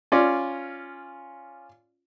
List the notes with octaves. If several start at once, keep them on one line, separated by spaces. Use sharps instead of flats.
C#4 F4 D5